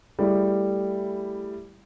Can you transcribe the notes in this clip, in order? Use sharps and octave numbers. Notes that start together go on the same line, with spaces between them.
G3 A3 E4 G#4